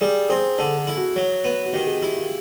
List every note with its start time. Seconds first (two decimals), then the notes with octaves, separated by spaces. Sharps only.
0.01 G3 G#4
0.29 C4 G#4
0.58 D3 A4
0.77 A4
0.87 E4
0.97 F#4
1.16 F#3
1.44 B3
1.66 F#4
1.73 D#3 G4
1.87 G#4
2.02 E4 G4
2.16 F4